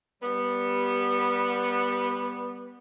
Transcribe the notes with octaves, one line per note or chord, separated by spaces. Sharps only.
G3 B3